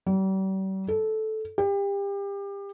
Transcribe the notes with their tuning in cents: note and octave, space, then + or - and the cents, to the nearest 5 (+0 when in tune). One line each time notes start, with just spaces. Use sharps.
G3 -40
A4 -10
G4 +30